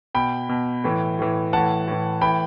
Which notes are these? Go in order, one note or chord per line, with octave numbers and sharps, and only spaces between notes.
B2 G5 B5
B2
A2 E3
A2 E3
A2 E3 F#5 A5
A2 E3
A2 E3 G5 B5